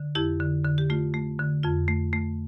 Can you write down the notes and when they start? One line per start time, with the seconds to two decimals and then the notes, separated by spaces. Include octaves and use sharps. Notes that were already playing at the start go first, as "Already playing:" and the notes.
Already playing: D3
0.15 F2 E4 G4
0.40 D3
0.65 D3
0.78 G4
0.90 A3 F4
1.14 A3
1.40 D3
1.63 F2 F4
1.88 A3
2.13 A3